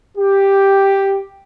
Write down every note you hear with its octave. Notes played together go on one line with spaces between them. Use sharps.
G4